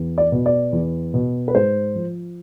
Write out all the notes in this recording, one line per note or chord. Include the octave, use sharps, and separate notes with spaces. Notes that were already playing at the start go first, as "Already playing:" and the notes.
Already playing: E2
D5
B2
D5
E2
B2
B4
G#2 C5
F3